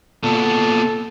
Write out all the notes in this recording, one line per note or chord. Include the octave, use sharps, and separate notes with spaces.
A#2 B3 A4